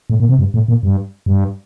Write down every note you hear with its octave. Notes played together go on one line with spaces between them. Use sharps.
A2
A#2
C3
G2
A2
A#2
G2
G2